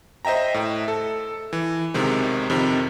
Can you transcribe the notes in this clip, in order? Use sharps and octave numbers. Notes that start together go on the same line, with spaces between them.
C5 D#5 E5 G5 A#5
A2 E5
A4
E3
B1 C3 D#3 G#3
F2 C3 D#3